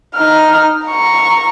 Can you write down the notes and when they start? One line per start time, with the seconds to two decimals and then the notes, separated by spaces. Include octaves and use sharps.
0.16 D#4 F6
0.87 A#5 C#6